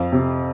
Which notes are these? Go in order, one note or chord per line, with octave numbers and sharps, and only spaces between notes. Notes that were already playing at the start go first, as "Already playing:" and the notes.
Already playing: F2 F5
C3